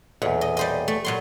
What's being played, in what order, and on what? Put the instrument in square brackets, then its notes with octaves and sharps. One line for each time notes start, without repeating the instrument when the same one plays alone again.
[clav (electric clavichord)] B1 E2 [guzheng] A#2
[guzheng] D#5
G3 C5 D#5
A3
A#2 F#3 C6